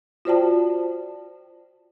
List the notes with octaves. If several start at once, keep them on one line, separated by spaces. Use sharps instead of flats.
F4 F#4 C5 D5 G5 A5